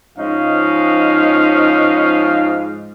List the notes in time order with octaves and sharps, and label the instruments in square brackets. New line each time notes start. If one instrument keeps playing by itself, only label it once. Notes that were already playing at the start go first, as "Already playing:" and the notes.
[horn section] G#2 F3 C#4 D#4 D#5 F5